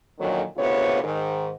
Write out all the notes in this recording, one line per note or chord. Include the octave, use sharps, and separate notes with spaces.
F2 A#2 D3 D#3 F#3
D2 C3 B3 F4 G#4 C#5
G#2 D#3